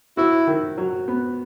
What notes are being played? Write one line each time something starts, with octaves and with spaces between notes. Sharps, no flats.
E4 F#4
D#3
F#3
B3